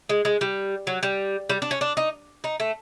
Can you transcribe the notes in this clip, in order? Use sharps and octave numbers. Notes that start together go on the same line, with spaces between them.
G#3
G#3
G3
F#3
G3
G3
D4
C#4
D4
D#4
D#4
A3